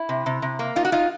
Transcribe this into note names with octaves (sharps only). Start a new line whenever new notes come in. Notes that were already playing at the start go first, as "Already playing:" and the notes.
Already playing: E4
C3
C3
C3
A#3
D#4 F4
F#4
D#4 F4